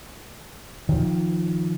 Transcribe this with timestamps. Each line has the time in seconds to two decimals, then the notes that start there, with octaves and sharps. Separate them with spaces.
0.89 D#3 F3